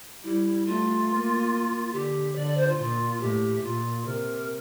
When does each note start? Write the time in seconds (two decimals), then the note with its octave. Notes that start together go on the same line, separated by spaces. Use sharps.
0.23 G3 E4
0.66 A3 F4
1.09 A#3
1.93 D3 G4
2.35 D3 D5
2.46 D5
2.57 C5
2.67 F4
2.77 A#2 F4
3.20 A2 G4
3.62 A#2 F4
4.05 C3 A#4